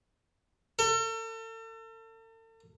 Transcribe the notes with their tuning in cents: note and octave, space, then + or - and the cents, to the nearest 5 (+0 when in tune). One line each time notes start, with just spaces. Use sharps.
A4 +40